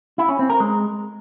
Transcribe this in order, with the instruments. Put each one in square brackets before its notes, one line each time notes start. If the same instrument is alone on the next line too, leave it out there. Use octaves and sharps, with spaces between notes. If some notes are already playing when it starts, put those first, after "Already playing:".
[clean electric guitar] E4
C#4
C4
A#4
G#3